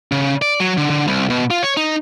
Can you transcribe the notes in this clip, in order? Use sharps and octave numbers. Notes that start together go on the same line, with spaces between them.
C#3
D5
F#3
D3
D3
C2
B2
F4
C#5
D#4